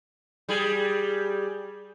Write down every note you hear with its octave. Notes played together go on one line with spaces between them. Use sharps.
G3 G#4